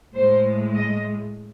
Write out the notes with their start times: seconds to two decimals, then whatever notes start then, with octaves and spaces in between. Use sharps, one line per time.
0.14 A2 G#3 C5
0.74 D#5